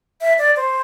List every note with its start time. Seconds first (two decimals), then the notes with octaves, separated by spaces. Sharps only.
0.21 E5
0.38 D5
0.57 C5